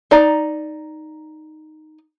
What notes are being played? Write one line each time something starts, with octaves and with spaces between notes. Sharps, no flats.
D#4 D5 A#5